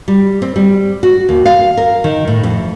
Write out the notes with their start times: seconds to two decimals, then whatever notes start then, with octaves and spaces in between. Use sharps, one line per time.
0.08 G3
0.42 C4
0.56 G3
1.03 F#4
1.29 D#2
1.46 F5
1.77 A#4
2.04 D#3
2.27 A2
2.43 F2